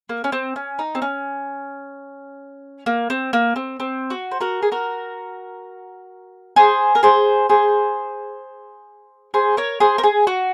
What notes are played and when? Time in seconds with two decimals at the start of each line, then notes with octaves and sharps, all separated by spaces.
0.09 A#3
0.24 C#4
0.32 C4
0.56 C#4
0.79 D#4
0.95 C4
1.02 C#4
2.86 A#3
3.10 C4
3.33 A#3
3.56 C4
3.80 C4
4.10 F#4
4.31 C5
4.40 F#4 A#4
4.62 G#4
4.72 F#4 A#4
6.56 G#4 C5
6.95 A#4
7.03 G#4 C5
7.49 G#4 C5
9.34 G#4 C5
9.57 A#4 C#5
9.80 G#4 C5
9.98 A#4
10.03 G#4
10.27 F#4